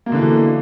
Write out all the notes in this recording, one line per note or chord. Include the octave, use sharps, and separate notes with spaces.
B2 D3 E3 A#3